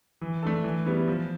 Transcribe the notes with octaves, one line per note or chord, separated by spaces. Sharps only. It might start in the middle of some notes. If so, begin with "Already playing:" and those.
E3
A3 D4 A4
E3
G3 B3 E4
F3